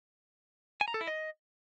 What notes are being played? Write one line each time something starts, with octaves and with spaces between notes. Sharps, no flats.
G#5
A#5
A4
E4
D#5